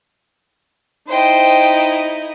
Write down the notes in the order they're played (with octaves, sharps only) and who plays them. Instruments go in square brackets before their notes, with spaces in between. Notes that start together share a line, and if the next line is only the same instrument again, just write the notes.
[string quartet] D#4 E4 D#5 [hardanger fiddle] C5 G5